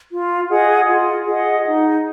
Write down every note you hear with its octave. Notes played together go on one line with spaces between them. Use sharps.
F4
G#4 D#5 F#5
F4
G#4 D#5 F#5
D#4